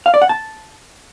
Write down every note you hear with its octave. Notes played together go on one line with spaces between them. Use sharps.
F5
D5
F#5
A5